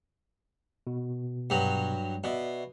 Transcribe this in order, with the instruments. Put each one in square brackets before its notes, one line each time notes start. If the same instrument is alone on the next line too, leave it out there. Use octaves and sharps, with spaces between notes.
[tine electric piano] B2
[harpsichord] G2 F#3
[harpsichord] B2 [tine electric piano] D5 E5